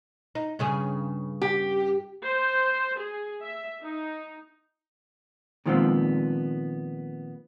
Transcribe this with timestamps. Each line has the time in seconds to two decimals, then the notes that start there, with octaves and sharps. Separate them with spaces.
0.35 D#4
0.59 G2 C#3 G#4
1.42 G4
2.24 C5
2.97 G#4
3.43 E5
3.82 D#4
5.66 A#2 D#3 F3 G#3 B3 C4